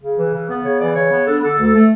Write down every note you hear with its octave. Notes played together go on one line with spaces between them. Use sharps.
C#3
E3
C#3
B3
C#3 C#5
E3 D5
C#3 C#5
B3
D4 A4
D3 A4
D2
A3